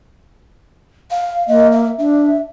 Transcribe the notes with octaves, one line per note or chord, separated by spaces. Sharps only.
F5
A#3 D#5
E5
D4 E5